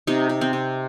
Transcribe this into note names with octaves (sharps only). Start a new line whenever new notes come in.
C3 D#4
C3
C4
C3